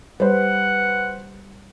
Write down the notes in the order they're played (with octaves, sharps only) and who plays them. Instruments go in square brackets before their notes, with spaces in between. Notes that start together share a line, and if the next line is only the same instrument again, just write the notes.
[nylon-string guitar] G3 [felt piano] B4 C5 [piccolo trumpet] F#5